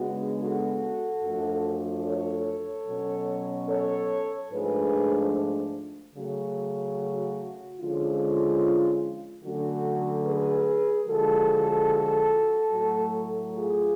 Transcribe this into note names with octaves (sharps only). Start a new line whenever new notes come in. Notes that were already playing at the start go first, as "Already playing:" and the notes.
Already playing: C#3 G#3 B3 D4 F#4
F#4 A4
F#2 F3 A3 D4
A4 C#5
B2 F#3 C#4
A4 C#5
G#2 F3 A3 D4 G#4 B4
C#3 F#3 A3
F#4
D3 F3 G#3 C#4 F4
D3 F#3 A3 C#4 F#4
G#4 B4
D3 F3 G#3 F#4 A4
A2 F#3 A3
F4 G#4